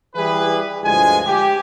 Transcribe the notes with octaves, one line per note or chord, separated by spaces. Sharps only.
E3 G3 E4 G#4 B4
D2 G2 F3 G#3 G#5
G4